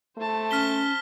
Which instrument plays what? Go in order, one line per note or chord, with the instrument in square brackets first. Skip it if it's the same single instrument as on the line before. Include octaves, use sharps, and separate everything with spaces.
[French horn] A3 [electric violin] C5 A5
[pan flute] C#4 [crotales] F6 B6 G7